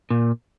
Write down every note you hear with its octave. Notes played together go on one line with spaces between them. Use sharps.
A#2